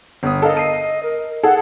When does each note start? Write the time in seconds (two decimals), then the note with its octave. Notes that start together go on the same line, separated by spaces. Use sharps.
0.23 G1 D#6
0.42 A4 A#4 D#5 F5
0.57 C7 D#7
1.03 A#4
1.43 G#4 A4 F#5